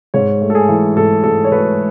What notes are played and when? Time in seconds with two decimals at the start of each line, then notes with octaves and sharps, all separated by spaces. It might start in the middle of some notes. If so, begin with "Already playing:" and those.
0.14 G#2 C#5
0.42 A3
0.50 A4
0.55 G#4
0.69 E3
0.96 G#2 A4
1.24 G#2 A4
1.44 C#5
1.52 A3 B4